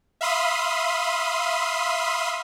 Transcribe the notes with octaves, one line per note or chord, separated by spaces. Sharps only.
E5 F5 B5 C6 D#6